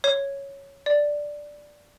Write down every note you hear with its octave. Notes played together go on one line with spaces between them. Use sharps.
C#5
D5